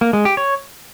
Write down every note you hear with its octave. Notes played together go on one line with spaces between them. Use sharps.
A#3
G#3
G4
C#5